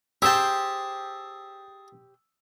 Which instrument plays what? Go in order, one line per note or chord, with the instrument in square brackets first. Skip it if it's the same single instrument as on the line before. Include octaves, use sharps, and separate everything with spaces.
[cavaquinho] G4 C5 G5 [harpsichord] G#4 A5 [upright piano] E6